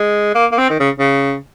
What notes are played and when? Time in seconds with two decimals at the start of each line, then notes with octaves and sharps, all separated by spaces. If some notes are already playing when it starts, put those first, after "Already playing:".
Already playing: G#3
0.35 A#3
0.52 A#3
0.58 C4
0.70 D#3
0.80 C#3
0.99 C#3